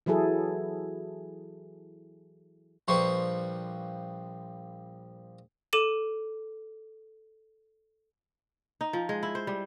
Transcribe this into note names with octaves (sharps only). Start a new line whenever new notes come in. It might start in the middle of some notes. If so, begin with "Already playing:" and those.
E3 F#3 E4 G#4 A4
A#1 F3 G3 B4 C6 C#6
A4 D6 D#7 E7
D#4
F3
G#3
E4
C5
G3